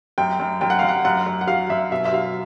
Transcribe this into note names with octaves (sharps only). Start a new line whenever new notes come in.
F#2 G5
F#2
F#2 G5
F#5
F#2 F5
F#5
F#2 F#5
F#2
F#5
F#3 F5
F#2 E5
B2 E5
E5
F#3 F5